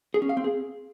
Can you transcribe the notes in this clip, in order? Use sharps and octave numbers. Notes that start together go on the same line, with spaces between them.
G#4
C#4
F5
C4
G#4